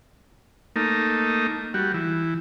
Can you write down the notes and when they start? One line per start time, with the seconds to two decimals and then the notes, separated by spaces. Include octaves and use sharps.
0.76 A3 A#3 D#4
1.74 G3 F#4
1.94 E3